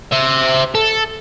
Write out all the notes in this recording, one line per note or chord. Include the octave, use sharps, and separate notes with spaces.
C5 E5
A4